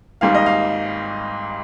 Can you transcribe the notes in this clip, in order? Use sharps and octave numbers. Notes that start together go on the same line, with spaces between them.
G#1 G#2 G3 A#3 F5
D#5
F5